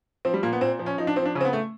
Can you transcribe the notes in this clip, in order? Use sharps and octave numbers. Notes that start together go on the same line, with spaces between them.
F3 C4
G3
A#2 A#3
B3
A#2 C4
F3
C#4
F3 D#4
D4
F3 C4
D4
C#3 C#4
C4
B3
A3